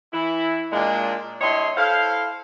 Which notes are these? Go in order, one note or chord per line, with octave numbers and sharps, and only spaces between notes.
E3 E4
A#2 G#3 D4
G2 E4 C#5 D#5 C6
E4 A4 C5 F5